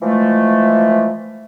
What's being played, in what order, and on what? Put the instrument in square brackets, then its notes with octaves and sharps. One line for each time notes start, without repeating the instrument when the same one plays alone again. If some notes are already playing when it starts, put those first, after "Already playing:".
[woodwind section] E3 F3 G#3 A3